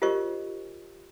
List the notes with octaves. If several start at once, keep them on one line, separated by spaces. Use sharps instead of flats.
F4 G4 A#4 C5 D#5 C#6